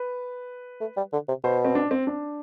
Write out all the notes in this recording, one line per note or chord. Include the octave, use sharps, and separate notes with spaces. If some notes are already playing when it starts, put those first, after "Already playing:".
Already playing: B4
A3
G3
D3
C3
B2 C5
C4
D4
C4
D4